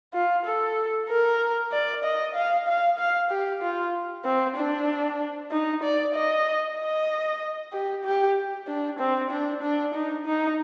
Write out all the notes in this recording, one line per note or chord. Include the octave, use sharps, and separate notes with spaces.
F4
A4
A#4
D5
D#5
F5
F5
F5
G4
F4
C4
D4
D#4
D5
D#5
D#5
G4
G4
D4
C4
D4
D4
D#4
D#4